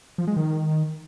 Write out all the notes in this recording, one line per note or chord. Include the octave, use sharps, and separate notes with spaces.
F3
G#3
D#3